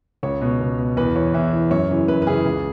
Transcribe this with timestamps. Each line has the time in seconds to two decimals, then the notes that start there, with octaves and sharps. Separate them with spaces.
0.23 C#2 C#5
0.41 B2
0.60 C#2
0.79 B2
0.97 E2 B4
1.15 E3 C#5
1.34 E2 E5
1.52 E3
1.71 F#2 C#5
1.90 C#3 E3
2.08 F#2 B4
2.22 B4
2.26 C#3 E3 G#4
2.45 C#2